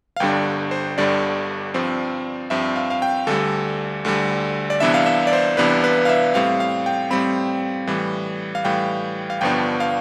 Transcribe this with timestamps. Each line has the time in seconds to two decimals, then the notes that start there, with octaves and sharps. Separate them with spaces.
0.16 F5
0.20 G1 G2 D3 G3 D4 G5
0.71 C5
0.98 G1 G2 D3 G3 D4 D5
1.74 G2 F3 C4
2.50 G2 F3 C4 E5
2.76 F5
2.90 F5
3.02 G5
3.27 D2 D3 G3 A4
4.05 D2 D3 G3
4.70 D5
4.80 C2 C3 E3 B3 D4 E5
4.94 F5
5.06 E5
5.27 D5
5.33 C5
5.57 C2 C3 E3 B3 D4 B4
5.84 B4
6.05 F5
6.09 E5
6.34 A2 G3 C4 F5
6.60 F5
6.86 G5
7.11 A2 G3 C4 B5
7.87 A2 E3 G3
8.55 F5
8.65 A2 E3 G3 G5
9.30 F5
9.41 G1 G2 F3 B3 D4 G5
9.80 F5